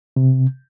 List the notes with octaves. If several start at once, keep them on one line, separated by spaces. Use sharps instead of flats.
C3